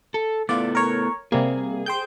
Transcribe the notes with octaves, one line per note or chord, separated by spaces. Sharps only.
A4
A3 B3 E4 F4 D5
A#4 C#5
C3 G3 A#3 G#4
C5 G5 G6